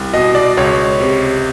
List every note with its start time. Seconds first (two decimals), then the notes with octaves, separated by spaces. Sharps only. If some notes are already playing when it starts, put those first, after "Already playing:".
Already playing: C2
0.13 B2 D#5
0.35 D5
0.57 C#2 C#5
1.00 C3